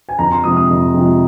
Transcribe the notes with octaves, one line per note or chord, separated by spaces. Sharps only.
G#5
F2 A#5
C6
C3 F3 G#3 D#6
D#6
F2
C3 F3 G#3